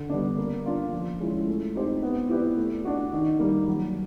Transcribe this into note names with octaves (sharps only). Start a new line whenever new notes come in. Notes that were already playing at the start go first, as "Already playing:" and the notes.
Already playing: D3
G3 B3 D4
A#3
D4 F4
F3
G#3 C#4 E4
A3
C4 D#4 G4 C5
B3
E4 G4 B4 D5
A3
D4 F#4
D#3
G3 A#3
F#3